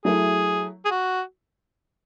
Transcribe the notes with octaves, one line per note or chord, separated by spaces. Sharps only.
F#3 A3 E4 G#4
G#4
F#4